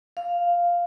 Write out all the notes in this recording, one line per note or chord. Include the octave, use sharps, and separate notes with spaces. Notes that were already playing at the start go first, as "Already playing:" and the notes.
F5